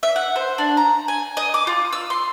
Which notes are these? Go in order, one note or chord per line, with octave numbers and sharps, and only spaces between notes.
E5
F#5
C5
D4
A#5
G#5
D#5
D6
F4
E6
C6